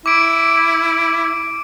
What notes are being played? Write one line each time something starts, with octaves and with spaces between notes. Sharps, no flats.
E4 D6 D7